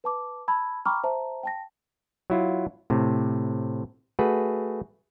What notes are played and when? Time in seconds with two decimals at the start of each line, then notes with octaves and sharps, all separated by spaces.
0.04 B4 A5 D6
0.48 A5 B5 E6 G#6
0.85 G5 A#5 B5 C#6 D6 F6
1.03 C5 E5 A5 A#5
1.43 G5 A5 A#6
2.30 F#3 E4 F4
2.90 A2 C3
4.19 A3 F#4 G#4 B4